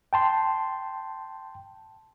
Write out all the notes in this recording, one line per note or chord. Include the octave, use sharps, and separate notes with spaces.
G5 A5 C6